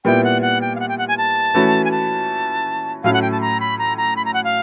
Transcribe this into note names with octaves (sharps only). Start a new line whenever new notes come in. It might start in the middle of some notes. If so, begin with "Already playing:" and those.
A#2 G3 B3 E4 G5
F#5
F#5
G5
F5
F#5
G5
F#5
G#5
A5
E3 A3 C#4 F#4
G#5
A5
A2 F#3 A3 C#4 F5
F#5
G5
A5
A#5
B5
A#5
A#5
B5
A#5
F#5
F5